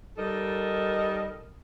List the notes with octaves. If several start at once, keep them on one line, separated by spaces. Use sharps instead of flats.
G3 D#4 A4 A#4 D#5